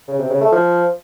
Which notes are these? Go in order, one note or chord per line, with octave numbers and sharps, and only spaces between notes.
C#3
C3
C#3
A3
F3